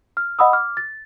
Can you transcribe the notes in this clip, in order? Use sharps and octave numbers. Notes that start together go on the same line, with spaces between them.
F6
D#5 F#5 B5 D#6 E6
D6 F6
A6